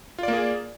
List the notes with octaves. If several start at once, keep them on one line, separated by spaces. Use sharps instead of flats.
A#3 F4 G#4 D5